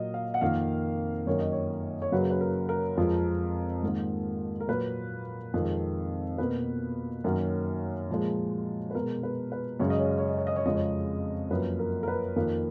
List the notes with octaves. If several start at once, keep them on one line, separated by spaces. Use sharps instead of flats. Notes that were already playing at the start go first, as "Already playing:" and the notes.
Already playing: A#2 F#3 A#3 D#5
F5
F#5
F2 D#3 A#3 F5
F#2 D#3 A#3 C#5
D#5
C#5
C#5
F#2 C#3 F#3 A#3 B4
B4
A#4
A#4
F2 F3 G#3
G#2 D#3 A#3
A#4
A#2 F#3 A#3 B4
F2 D#3 G#3
B2 A#3 B4
F#2 D#3 F#3 A#3
A#2 F3 G#3
B4
B2 G#3 A#4
B4
B4
F#2 C#3 G#3 C#5
D#5
C#5
D#5
C#5
D#5
C#5
D#5
C#5
F2 C#3 G#3 D#5
C#5
F#2 F3 A#3 B4
A#4
A#4
B4
F2 D#3 A#3